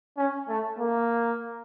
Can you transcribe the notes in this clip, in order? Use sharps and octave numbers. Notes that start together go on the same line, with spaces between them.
C#4
A3
A#3